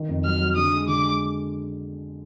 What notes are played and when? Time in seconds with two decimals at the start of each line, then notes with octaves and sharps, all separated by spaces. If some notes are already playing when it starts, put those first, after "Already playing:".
Already playing: D#3
0.09 F2
0.25 F#3 F6
0.40 F#3
0.56 D3 D#6
0.73 G#3
0.88 D3 D6
1.05 G#3